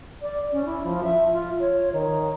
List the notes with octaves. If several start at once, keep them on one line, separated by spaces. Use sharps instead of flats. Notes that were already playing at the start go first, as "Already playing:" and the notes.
D5
C#4
E4
F3
E5
F4
C#5
D#3